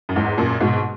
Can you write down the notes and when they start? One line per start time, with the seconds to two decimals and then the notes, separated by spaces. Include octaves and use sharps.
0.09 F#2
0.16 E2 G#2
0.38 F#2 A#2
0.60 G#2 B2